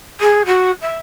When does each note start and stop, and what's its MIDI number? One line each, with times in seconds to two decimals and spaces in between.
0.20 0.42 68
0.45 0.71 66
0.81 0.98 76